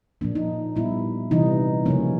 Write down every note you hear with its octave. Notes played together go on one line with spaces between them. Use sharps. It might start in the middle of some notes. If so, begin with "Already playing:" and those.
A#2 F3 A#3 D4
D#4
A#2 G3 B3 E4
C3 E3 G3 D#4
C#3 F3 A#3 C#4